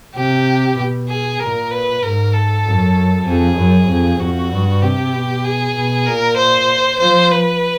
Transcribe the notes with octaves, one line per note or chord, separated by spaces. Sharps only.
C3 G4
B2
G#4
A#2 A#4
B4
G#2 A#4
A4
F#2
F2 G#4
F#2
F2
F2 F#4
G2
C3 G4
B2
G#4
B2
A#2 A#4
C5
F3 C5
B4